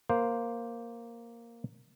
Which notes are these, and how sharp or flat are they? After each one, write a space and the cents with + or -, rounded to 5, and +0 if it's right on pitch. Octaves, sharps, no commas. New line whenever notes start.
A#3 +0 C5 +0